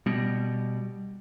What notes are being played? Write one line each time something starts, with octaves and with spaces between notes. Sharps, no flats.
B2 G3